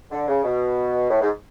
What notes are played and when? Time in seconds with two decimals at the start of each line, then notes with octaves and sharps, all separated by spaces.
0.11 D3
0.28 C#3
0.44 B2
1.10 A2
1.21 G#2